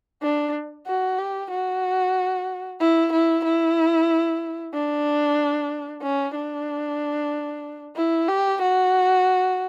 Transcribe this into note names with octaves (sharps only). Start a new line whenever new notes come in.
D4
F#4
G4
F#4
E4
E4
E4
D4
C#4
D4
E4
G4
F#4